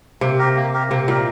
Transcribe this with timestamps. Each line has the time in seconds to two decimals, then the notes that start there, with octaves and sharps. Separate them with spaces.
0.21 C3 A#3
0.39 G4 A#4
0.56 A#3
0.73 G4 A#4
0.90 C3 A#3
1.08 A#2 G4 A#4